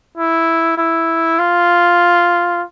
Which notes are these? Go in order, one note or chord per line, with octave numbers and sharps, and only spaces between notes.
E4
E4
F4